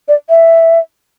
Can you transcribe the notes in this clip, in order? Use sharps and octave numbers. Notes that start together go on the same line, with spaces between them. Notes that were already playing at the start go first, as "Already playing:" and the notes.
D5
E5